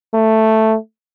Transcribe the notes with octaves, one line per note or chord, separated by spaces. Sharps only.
A3